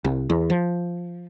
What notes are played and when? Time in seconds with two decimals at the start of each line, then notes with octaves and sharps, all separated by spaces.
0.04 C2
0.30 E2
0.50 F3